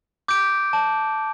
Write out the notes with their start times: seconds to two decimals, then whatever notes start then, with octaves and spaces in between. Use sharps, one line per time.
0.28 D6 G6 D7
0.73 A5